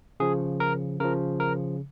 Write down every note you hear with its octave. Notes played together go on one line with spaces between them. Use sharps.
C#3 F3 G#4
A#4
C#3 F3 A#4
A#4